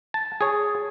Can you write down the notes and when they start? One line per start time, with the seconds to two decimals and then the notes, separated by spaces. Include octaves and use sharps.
0.14 A5
0.41 G#4 C#5